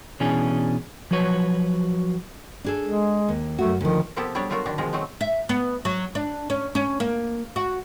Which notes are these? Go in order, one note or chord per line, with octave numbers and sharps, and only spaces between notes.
B2 E3 C#4 D4 G#4
F3 F#3 F#4 B4 C#5
D4 G#4 A4
G#3
D#2
F#2 A3 F#4
D2 D#3 F3
C3 F3 A#3 B3 G4 A4
F#3 G3 B3 D4 C#5 D5
F#3 A3 F4 F#4 A#4
D3 D#3 D4
B2 D#3 F3 G#3 A#4
F#3 A3 C4 D#4
E5
B3
F#3
D4
C#4
C#4
A#3
F#4